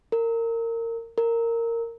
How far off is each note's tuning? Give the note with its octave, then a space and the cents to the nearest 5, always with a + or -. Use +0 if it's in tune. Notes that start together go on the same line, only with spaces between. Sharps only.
A#4 -25
A#4 -15